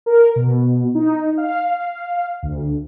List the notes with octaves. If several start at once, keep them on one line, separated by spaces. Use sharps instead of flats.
A#4
B2
D#4
F5
D2